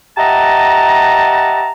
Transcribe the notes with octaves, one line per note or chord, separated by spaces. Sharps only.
G4 D#5 E5 F#5 A5 A#5